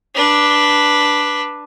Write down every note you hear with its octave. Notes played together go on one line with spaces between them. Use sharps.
D4 B4